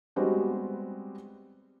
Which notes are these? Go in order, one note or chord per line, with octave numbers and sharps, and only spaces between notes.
G3 G#3 B3 C4 F#4 G4